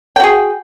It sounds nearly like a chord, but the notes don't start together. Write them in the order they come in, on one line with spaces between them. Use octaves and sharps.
G5 F#4 G#4